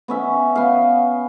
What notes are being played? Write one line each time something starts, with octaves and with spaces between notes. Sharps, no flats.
B3 C#4 E5
B3 F5